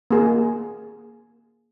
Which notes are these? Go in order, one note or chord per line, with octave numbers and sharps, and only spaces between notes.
A#3 G#4